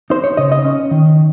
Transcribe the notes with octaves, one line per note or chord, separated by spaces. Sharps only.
D#4 C5
C#5
C#3 D#5
D#5
C#4
D#3